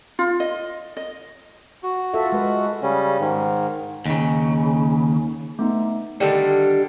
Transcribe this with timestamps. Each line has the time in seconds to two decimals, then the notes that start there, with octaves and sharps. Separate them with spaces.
0.19 F4
0.40 D#5
0.97 D#5
1.83 F#4
2.14 F4 A4 E5
2.32 G#3 B4
2.82 C#3 G3 C#4
3.20 G#2 D#3
4.06 D#2 C#3
5.59 A3 B3 D#4
6.20 D3 D#3 G3 G5 C#7